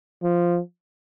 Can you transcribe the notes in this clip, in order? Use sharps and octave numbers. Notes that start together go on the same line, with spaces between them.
F3